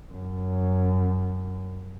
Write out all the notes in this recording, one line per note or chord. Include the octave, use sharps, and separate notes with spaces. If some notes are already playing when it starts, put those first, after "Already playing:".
F#2